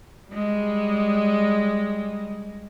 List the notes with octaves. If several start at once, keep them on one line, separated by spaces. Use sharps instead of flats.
G3 G#3